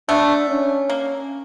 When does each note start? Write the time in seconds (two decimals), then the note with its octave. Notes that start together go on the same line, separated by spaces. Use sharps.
0.09 A3 B3 D4
0.49 C#4
0.90 A#3